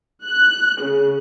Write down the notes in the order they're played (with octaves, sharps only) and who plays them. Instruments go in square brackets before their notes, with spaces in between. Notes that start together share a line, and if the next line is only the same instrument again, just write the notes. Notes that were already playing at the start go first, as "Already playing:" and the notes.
[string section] F#6
C#3